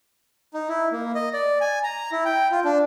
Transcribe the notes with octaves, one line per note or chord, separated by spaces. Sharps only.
D#4
E4
A#3
D#5
D5
G#5
A#5
E4
G5
F4
D4